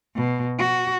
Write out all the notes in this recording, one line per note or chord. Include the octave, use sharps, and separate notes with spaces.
B2
F#4